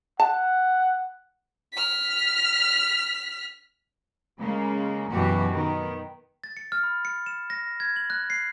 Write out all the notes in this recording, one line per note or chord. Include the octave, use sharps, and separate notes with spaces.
F#5 A5
F6 B6
C#3 G#3 A#3
F#2 B2 E3 F#3 F#4 G4
D#3 B3
A6
C#7
F6
B5
C#7
E7
A#6
G#6
F#7
F#6
C7